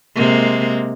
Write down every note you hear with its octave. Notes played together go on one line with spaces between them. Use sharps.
C3 G#3 A#3